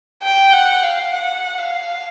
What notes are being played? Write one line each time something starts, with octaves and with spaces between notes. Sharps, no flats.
G5
F#5
F5
F#5
F5